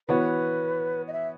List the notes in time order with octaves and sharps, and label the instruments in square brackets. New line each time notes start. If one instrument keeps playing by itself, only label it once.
[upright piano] E3 B3 F#4 C#5 [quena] B4
[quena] D#5
E5